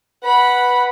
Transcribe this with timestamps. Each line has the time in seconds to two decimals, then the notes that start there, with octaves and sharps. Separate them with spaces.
0.24 B4 F#5 B5